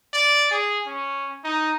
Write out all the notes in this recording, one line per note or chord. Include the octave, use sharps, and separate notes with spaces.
D5
G#4
C#4
D#4